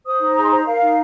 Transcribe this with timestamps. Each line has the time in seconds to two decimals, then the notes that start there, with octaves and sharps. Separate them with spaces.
0.05 C5 D#6
0.20 D#4
0.35 G#4 A#5
0.43 C6
0.50 C5 A#5
0.65 A#4 F5
0.81 D#4